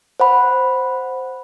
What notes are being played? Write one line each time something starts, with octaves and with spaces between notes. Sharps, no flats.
C5 F#5 B5